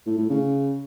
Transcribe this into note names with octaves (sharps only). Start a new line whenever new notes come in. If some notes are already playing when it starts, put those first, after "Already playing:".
A2
A2
C#3